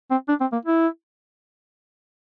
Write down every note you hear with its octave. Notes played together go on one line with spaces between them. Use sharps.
C4
D4
C4
A#3
E4